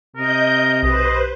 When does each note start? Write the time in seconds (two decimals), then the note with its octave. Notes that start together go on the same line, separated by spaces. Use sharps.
0.16 C3 A#4 D#5 G6
0.83 B1 G4 B4 C5 D#5 B5